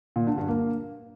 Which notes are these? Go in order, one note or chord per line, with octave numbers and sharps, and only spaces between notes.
A#2
D3
G2
A#3